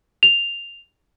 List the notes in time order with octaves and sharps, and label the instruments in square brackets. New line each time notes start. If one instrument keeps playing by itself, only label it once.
[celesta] F7